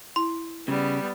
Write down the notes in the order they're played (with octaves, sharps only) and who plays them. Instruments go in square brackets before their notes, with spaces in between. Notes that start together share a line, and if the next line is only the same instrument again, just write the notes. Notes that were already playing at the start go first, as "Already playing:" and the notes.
[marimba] E4 [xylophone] C6
[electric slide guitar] C#3 [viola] G3 B3